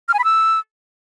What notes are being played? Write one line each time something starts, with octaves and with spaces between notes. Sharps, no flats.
F6
G#5
B5
E6